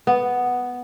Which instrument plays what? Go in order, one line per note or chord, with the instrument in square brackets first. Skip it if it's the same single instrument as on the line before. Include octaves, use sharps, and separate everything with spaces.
[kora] B3